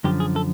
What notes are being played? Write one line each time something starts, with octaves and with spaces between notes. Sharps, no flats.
F#2 D3 F3 G4
G#4
A4